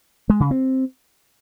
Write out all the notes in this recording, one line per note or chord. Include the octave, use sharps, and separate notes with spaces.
G#3
C#3
C4